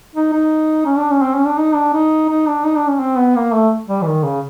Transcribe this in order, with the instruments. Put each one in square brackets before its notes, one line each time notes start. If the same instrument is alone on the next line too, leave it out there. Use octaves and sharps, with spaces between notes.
[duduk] D#4
D#4
C#4
D4
C#4
C4
C#4
D4
D#4
D4
D#4
D#4
D4
D#4
D4
C#4
C4
B3
A#3
A3
G3
E3
D#3
C#3